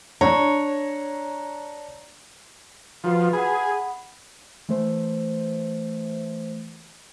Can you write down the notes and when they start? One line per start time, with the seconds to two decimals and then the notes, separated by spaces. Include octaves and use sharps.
0.21 D4 C#5 A#5
3.04 F3 F4 F#4 B4
3.33 G#4 F#5 B5
4.69 E3 A3 C5